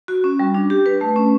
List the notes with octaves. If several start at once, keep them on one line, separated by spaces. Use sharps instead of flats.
F#4
C#4
G3
D4
G4
B4
A3
C#4